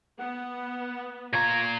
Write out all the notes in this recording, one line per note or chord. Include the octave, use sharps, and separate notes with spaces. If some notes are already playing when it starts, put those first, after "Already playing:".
B3 F#5
A#2 F4 A#5 C#6 G#6